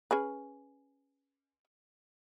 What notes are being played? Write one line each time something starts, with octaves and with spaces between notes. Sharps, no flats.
C#4 G#4 B4